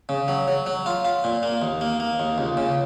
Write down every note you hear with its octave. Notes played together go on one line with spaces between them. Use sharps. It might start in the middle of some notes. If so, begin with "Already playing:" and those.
C#3
F#3
F#3
F#3
F4
F4
A#2
A#3
D#2
A#3
A#3
D#2
C#2
C#3